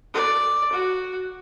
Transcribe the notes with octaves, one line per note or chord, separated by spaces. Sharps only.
D5
F#4